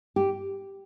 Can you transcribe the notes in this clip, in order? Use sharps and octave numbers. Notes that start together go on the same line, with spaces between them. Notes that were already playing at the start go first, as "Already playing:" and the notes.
G4